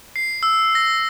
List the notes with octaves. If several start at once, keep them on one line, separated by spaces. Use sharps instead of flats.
C7
E6
A#6